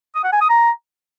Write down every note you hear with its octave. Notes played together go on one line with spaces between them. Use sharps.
D#6
F#5
G#5
D#6
A#5